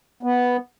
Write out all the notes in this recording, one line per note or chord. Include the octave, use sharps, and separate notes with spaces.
B3